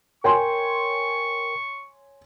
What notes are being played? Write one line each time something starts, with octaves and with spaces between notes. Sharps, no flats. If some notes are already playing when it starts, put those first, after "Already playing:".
A#4 C#5 G5 G#5 C6 C#6